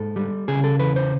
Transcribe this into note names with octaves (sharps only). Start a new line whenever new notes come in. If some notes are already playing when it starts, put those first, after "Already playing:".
Already playing: G#2 A4
G3
C#3 G#4
A4
E2 B4
C5